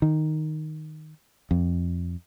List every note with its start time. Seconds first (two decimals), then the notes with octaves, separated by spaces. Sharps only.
0.02 D#3
1.51 F2